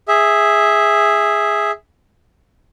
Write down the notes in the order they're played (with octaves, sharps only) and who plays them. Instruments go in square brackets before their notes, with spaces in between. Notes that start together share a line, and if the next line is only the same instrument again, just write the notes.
[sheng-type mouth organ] G#4 E5